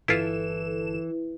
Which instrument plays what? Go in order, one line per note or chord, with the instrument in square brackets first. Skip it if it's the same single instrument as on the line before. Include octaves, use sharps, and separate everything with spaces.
[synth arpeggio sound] G1 A4 E7 [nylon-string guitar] E3 [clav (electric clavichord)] E4 F4